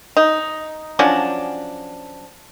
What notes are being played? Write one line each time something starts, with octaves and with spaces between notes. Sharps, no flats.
D#4
F3 F#3 C#4 D4